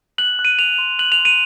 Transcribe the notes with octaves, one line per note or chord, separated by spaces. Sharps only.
F#6 F#7
F#6
D#7
F#6 F7
C6
F#6 F#7
F7
C6
D#7